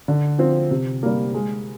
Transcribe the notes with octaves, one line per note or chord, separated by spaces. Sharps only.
D3
F3 C4
C3
G3 A#3
G#3